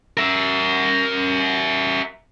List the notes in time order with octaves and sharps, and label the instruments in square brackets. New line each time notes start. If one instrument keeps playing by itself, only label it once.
[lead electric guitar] A#4 E5